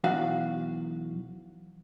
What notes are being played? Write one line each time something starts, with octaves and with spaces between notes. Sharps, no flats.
B1 E2 F#4 F5